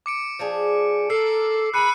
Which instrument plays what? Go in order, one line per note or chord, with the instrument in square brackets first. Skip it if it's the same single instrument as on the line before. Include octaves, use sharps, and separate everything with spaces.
[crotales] D6 C#7 D7
[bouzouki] F3 D4 G#4
[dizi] A4 [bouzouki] A#4 [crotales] E6 C7
[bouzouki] G#4 A#4 [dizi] B5 [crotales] F#6 C#7 D#7